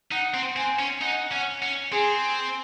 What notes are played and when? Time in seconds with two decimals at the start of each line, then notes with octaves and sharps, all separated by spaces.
0.12 D#4 F#5
0.34 C4
0.56 C4 G#5
0.79 C#4
1.02 D#4 F#5
1.32 C#4
1.62 C#4
1.92 C4 G#4